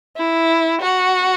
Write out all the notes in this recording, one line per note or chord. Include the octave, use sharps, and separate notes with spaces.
E4
F#4